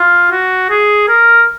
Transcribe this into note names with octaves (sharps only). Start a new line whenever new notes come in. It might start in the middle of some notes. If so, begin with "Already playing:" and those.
Already playing: F4
F#4
G#4
A#4